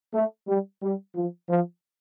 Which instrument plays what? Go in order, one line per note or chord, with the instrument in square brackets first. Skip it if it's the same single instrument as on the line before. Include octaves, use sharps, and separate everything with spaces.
[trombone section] A3
G3
G3
F3
F3